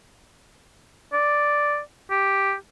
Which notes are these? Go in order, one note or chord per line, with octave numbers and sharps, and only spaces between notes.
D5
G4